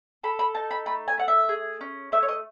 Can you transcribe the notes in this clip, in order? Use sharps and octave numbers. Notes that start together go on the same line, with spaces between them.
A4 B5
B5
D#4 A5
B5
A3 B5
G#5
A3 F#5
E5
G#4
C#4
A3 E5
C#5
D#5